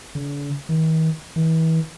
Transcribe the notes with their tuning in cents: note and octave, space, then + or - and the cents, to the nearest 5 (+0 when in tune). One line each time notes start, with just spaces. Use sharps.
D3 -45
D#3 +45
E3 -35